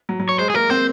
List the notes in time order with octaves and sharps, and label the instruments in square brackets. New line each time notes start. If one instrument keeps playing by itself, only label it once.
[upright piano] F#3
F#3
[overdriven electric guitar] C#5
[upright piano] G#3 [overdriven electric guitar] C5
[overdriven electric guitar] G#4
[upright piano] A#3 [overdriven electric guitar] A#4
[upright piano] C4 [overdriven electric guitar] C5